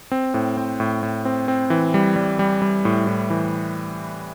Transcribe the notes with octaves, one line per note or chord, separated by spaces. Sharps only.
C4
A2
C4
A2
A2
C4
C4
E3
G3
G3
G3
G3
A2
A2
E3